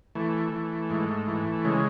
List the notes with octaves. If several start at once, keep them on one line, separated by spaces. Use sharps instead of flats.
E3 A3
E3
G#2
E3
C#3 G#3